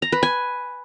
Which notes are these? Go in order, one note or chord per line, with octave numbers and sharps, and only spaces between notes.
A#5
B4
G#5